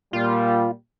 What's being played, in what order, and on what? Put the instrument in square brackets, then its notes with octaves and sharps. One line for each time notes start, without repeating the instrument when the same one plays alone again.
[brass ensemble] A#2 G3 [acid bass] F4